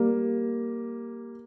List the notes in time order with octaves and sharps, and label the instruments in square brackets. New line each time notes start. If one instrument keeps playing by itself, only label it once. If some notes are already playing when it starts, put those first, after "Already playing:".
Already playing: [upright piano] G3 A#3